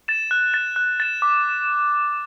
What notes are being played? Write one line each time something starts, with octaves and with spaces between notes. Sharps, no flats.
A6 E7
F#6
A6 E7
F#6
A6 E7
D6